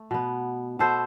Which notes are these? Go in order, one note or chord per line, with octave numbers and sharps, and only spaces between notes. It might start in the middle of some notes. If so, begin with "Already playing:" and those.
Already playing: A3
B2 B3
B2 B3 A4 C5